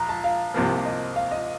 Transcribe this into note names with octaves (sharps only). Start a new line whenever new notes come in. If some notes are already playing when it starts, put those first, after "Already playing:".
Already playing: A#1 A#5
A5
F5
C2 C3 F3 A#3
D#5
F5
D#5